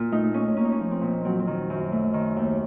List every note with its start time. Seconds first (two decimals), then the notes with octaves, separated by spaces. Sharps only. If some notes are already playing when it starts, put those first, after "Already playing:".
Already playing: A#2 F4
0.12 A3 D#4
0.34 A3 C#4
0.57 A#3 C#4
0.65 D#4
0.72 C#4
0.80 F3
0.91 C4
1.01 A#2
1.25 F#3 C4
1.39 C4
1.47 D#3
1.70 F#2
1.92 A3
2.14 D#3
2.36 D#2